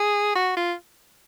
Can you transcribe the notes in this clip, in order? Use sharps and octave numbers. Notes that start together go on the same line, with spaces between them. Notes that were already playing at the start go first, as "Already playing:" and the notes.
Already playing: G#4
F#4
F4